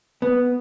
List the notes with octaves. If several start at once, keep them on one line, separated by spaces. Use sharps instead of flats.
B3